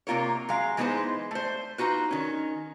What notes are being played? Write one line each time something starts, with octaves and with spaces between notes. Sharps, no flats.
C3 A#3 F4 A#4 C#5
F#3 G#3 F5
E3 G#3 B3 D#4 B4 C5
A3 C5
D#4 F4 F#4 B4
D#3 C#4